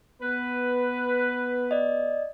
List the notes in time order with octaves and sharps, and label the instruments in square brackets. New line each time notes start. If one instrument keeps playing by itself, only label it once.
[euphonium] B3 [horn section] B4
[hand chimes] D5 D#5